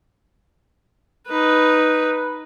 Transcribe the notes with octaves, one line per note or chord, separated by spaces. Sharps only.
D#4 B4